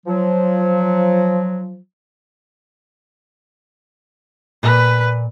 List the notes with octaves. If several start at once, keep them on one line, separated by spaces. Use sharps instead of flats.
F3 F#3
A#2 B4 D5